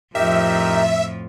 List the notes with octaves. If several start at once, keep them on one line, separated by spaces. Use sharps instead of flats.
F2 A2 F3 D#4 G4 A#4 E5